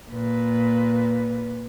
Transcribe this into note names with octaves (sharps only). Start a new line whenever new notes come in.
A#2 B4